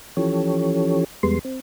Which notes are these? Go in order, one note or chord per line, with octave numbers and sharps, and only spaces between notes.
E3 F3 C#4 G4 A4 C#5
E2 G3 G#3 B3 C6
C4